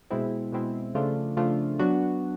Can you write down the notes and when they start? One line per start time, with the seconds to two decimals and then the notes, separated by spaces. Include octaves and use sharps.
0.10 B2 G#3 C4 E4
0.52 B2 G#3 C4 E4
0.95 C#3 F3 A3 D4 F4
1.36 C#3 F3 A3 D4 F4
1.79 F#3 B3 D4 F#4